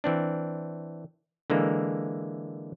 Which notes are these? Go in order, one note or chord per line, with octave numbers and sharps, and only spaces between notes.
E3 C4 D4
D3 E3 G#3 A#3